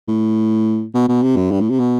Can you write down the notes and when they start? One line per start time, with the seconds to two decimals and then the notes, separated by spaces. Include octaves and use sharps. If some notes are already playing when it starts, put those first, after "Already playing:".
0.08 A2
0.95 B2
1.08 B2
1.23 C3
1.36 F#2
1.51 G2
1.61 A2
1.70 C3
1.79 B2